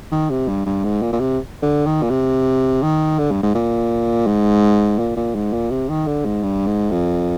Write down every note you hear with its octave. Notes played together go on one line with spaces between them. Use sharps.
D#3
C3
G2
G2
G#2
A#2
A#2
C3
D3
D#3
A#2
C3
D#3
D3
G2
G#2
A#2
G#2
A#2
A#2
G#2
A#2
C3
D#3
D3
G#2
G2
G#2
F2